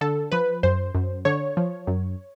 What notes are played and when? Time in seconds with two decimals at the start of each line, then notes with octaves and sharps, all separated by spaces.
0.01 D3 A4
0.31 F3 B4
0.63 F#2 C5
0.95 F#2
1.25 D3 C#5
1.57 F3
1.87 F#2